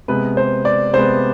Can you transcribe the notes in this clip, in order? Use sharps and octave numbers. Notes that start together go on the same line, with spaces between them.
C3 G#3 B3 B4
C5
D5
C3 G#3 B3 C5